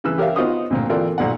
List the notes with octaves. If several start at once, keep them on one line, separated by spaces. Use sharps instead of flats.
C#3 E3 B4 E6
G4 A#4 C#5 E5 F5
B3 D#4 F4 F#4 C5 D#6
D2 A#2 C4
E3 C4 F4 A4 A#4 D5
B1 A#2 D5 F#5